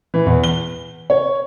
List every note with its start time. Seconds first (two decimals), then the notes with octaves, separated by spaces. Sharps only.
0.14 E3
0.26 E2
0.44 G7
1.10 C#5